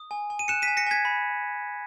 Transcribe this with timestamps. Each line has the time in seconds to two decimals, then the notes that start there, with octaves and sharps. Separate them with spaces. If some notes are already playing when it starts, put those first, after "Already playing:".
Already playing: D#6
0.11 G#5
0.30 G#5
0.39 D#7
0.48 F#6 C#7 E7
0.62 B6 D#7
0.68 G#5
0.77 A#6 C#7
0.87 G#5 G#6 B6
1.05 B5